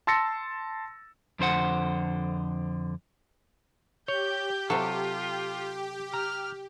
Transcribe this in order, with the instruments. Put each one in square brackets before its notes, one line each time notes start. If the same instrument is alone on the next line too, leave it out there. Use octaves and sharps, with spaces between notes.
[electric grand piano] A5 C6 E6 A6 A#6 C#7
[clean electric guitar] F2 D3 C5 F#5
[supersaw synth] G4 [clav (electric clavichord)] C#5 [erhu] G6
[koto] C3 F#3 [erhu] F4 [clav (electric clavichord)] A4
[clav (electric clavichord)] A#5 [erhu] F6